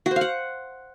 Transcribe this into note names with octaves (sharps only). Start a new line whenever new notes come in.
F#4
C5
F5
F#5